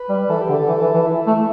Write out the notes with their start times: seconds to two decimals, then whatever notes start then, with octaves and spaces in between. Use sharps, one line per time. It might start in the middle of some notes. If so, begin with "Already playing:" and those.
Already playing: B4
0.09 G3
0.29 E3 A4
0.42 G4
0.49 D3
0.55 A4
0.68 E3
0.81 E3
0.94 E3
1.06 E4
1.27 A3